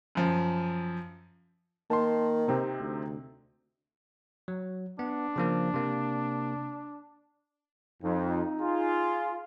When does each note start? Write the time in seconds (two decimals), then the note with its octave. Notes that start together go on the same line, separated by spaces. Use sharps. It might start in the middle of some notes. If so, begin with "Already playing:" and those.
0.15 F#2 F3
1.90 D#3 A#3 A5 C6
2.48 C3 C4 D#4
2.80 D2
4.48 F#3
4.99 B3 D4
5.36 C#3 F3 A#3
5.74 C3 A#3
8.03 F2 D#4
8.60 F4 G#4